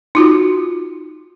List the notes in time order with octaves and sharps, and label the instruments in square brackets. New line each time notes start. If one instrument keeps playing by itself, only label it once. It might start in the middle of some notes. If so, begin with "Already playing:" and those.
[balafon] D#4 F4 F#4